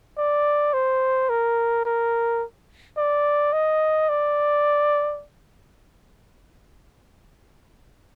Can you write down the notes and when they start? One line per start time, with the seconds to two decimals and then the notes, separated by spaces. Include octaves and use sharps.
0.18 D5
0.73 C5
1.30 A#4
1.85 A#4
2.97 D5
3.53 D#5
4.09 D5